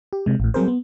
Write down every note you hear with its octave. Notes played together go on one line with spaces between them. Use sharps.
G4
C3 G#3
A1 A2
F#3 G3 C4 G#4 A#4 C5
B3